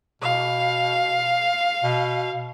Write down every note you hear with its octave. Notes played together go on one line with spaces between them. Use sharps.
B2 F5
B2